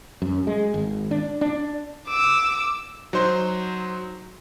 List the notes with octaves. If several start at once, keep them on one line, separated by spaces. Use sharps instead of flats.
F#2
G#3
G#1
D4
D4
D6 E6
F#3 D#4 C5 C6